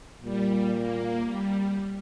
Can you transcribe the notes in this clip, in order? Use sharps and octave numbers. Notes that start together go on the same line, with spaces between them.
A#2 G3
A#3
G3